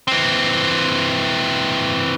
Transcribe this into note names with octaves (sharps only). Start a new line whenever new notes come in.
E3 C4